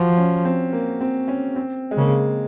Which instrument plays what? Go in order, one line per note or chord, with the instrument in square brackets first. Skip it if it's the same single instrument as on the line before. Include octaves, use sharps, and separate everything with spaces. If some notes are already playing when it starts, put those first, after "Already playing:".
Already playing: [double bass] F3 [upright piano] F#4
[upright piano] C#4
C4
A#3
C4
C#4
C4
G#3
[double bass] C#3 [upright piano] A#3